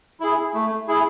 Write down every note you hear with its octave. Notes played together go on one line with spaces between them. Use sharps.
E4 G#4
A3
E4 G#4